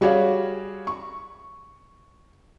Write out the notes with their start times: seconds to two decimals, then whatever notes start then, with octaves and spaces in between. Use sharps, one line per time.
0.01 G3 F#4 G#4 C#5 D5 F5
0.87 C#6